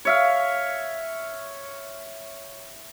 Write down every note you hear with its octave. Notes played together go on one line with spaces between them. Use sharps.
C#5 E5 F5